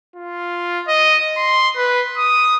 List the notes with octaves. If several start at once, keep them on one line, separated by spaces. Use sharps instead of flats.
F4
D#5
C6
B4
D#6